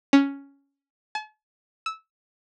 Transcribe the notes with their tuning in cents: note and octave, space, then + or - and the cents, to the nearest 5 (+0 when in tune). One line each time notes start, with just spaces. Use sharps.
C#4 +5
A5 -45
E6 -15